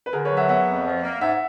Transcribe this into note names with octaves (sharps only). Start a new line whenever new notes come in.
B4
D3 G#4 A#4
B4 C#5
F#3
E5 F#5
B3 E5 F#5
F2
F3
A#3
G#2 E5 F#5